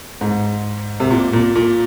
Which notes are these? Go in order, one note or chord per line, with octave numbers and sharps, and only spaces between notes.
G#2
C3
A#2
A#2
A#2